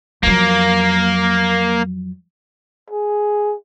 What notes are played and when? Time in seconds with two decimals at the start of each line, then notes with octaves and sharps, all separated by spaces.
0.23 F2 F#3 A#3
2.90 G#4